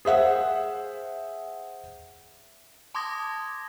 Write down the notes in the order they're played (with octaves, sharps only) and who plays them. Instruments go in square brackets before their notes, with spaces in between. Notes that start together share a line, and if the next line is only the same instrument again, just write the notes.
[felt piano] G#4 C5 E5 F#5
[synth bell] A5 C6 D6 D#6 G#6 A#6